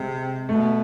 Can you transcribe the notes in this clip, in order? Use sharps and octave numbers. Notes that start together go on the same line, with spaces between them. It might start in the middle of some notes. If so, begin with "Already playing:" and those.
Already playing: C3 G#3
B2 A3